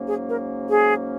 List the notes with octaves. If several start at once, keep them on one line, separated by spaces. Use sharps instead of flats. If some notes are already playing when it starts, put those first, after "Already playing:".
Already playing: G#2 F#3 A#3 C#4
G#4
A#4
G#4